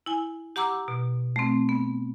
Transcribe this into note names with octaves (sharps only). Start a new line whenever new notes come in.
E4 G#5
G4 F#5 A#5 D6 E6
B2
A3 C4
B3